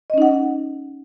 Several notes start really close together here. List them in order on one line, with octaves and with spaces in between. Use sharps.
D#5 C#4 D#4 F#5